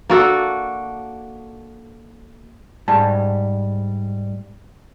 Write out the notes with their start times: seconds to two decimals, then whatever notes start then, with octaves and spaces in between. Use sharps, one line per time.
0.10 A#3 D4 F#4 A4
2.88 G#2 G3 A5